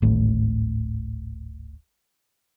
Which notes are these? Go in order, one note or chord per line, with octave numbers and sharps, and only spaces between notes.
D1 G#1 A2